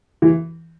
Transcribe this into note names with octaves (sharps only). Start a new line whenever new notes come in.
E3